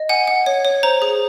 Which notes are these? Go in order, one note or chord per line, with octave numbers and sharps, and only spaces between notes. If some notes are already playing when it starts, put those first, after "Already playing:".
Already playing: D#5
F#5 G#5
F#5
C#5
C#5
C5 A#5
G#4